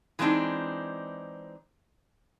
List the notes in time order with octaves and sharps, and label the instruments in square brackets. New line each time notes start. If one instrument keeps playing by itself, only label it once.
[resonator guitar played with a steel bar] E3 G#3 A3 C4 D4 D#4